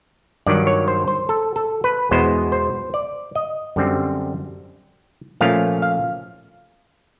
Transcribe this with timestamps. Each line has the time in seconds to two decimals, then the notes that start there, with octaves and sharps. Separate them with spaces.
0.46 G2 D#3 F#3 D5
0.67 C#5
0.88 C5
1.08 C5
1.29 A4
1.56 A4
1.84 B4
2.11 E2 B2 G#3 B3 C5
2.52 C5
2.94 D5
3.35 D#5
3.76 F#2 D3 G3 C4
5.41 A#2 F3 A3 C#4 F5
5.82 F5